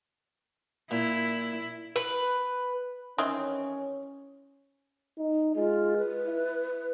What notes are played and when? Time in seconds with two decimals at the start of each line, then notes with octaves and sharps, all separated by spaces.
0.91 A#2 E4
1.96 B4
3.18 D#3 E3 C4 C#4
5.18 D#4
5.56 G#3 F4
5.97 B4
6.26 E4